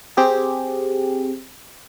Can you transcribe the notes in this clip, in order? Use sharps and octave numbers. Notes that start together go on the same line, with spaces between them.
C4 G4 G#4